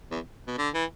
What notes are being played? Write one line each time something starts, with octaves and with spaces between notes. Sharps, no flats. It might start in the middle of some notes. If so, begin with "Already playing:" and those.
E2
B2
D3
E3